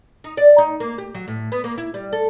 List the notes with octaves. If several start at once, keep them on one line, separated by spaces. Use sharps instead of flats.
D#4
D5
D#4
A#3
G4
F#3
A2
B3
A#3
E4
G3
A4